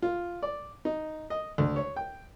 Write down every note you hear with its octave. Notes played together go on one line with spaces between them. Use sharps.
F4
D5
D#4
D#5
D2
C#5
G5